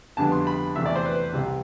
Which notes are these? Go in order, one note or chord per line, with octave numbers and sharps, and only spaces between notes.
F2 D3 G3 B3 D4 A5
C6
B5
E2 C3 E3 A3 E5
D5
C5
B4
C2 C3 G3